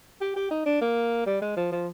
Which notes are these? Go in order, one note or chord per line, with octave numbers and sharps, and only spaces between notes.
G4
G4
D#4
D4
A#3
G3
G#3
F3
F3